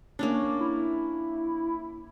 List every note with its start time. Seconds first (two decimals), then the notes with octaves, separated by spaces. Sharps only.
0.19 A#3 C#4 D4
0.60 E4